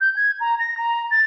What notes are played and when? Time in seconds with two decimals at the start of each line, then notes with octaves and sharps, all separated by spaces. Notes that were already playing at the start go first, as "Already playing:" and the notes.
0.01 G6
0.16 G#6
0.40 A#5
0.59 A#6
0.77 A#5
1.11 A6